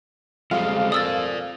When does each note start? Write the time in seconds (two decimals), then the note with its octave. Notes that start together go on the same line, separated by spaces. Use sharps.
0.51 F2 F3 G3 G#3 F5
0.92 A#4 D5 D#6 E6 A6